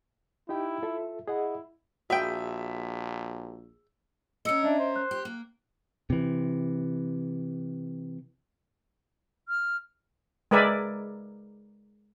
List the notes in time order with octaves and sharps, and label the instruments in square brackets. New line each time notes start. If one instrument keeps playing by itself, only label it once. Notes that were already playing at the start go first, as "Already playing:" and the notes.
[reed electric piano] D#4 G4 G5 [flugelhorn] E4
[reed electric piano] F4 A4 E5
[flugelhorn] E4 [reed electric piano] G#4 D#5 F#5
[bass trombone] A#1 [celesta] F#4 [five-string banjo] G#4 G5 [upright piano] E5
[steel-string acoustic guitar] C#4 A#4 [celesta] D#5 E6 C#7
[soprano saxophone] D4 [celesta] D#5 E5
[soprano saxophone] C5
[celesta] F#6
[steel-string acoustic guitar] G4
A#3
[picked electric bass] C3 E3
[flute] F6
[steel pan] G#3 A#4 B4 D5 E5 G#5